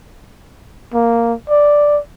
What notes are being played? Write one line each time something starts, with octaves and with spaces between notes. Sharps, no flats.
A#3
D5